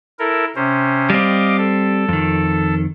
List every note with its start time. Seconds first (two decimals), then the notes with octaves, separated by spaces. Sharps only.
0.19 E4 A4 A#4
0.56 C3 C#4 C5
1.10 G3 C4 D#5 F5 D6
1.58 A4
2.09 F2 D#3